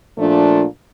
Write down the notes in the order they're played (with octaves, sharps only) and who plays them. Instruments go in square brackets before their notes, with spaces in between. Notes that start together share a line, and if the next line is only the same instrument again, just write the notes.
[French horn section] A#2 F3 A3 D4 F4